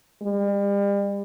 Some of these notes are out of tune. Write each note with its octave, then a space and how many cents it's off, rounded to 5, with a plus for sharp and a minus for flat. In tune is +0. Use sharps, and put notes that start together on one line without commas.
G3 +40